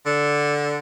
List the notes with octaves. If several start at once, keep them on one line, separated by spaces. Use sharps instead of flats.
D3